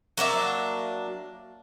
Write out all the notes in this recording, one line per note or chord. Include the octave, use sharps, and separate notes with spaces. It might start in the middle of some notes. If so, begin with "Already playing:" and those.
F#3 A#3 D4 E5